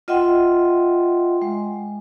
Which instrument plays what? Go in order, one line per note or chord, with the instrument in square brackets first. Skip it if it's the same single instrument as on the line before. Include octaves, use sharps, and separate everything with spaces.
[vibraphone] F4 D#5 E5 F#5 G5 C6
G#3